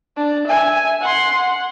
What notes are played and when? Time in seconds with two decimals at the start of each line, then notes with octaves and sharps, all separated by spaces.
0.17 D4
0.47 E5 G#5
1.01 F#5 C6
1.34 F#5